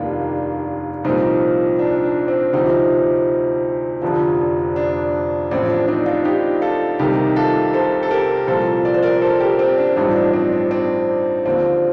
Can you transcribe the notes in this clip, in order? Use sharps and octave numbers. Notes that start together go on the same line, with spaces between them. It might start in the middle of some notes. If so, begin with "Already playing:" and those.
Already playing: F1 D#2 D#3 D4 F4
C2 A#2 F3 C4 D#4
D4
D4
C4
D2 C3 F3 C4 D#4
F1 F2 D3 F3
D4
A1 A2 F3 C4
D4
C4 D#4
D4 F4
D#4 G4
F4 A4
C2 C3 D#3 D#4 G4
F4 A4
A4 C5
A4
G4 A#4
C2 A#2 F3 A4 C5
D5
C5
A#4 D5
A4 C5
G4 A#4
C4
D4
A1 G2 F3 C4 D#4
D4
C4
D4
C4
D#2 D3 F3 C4